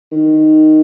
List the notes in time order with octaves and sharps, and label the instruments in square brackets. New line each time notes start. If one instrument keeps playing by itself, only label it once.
[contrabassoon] D#3